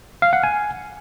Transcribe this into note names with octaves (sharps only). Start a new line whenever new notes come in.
F5
F#5
G#5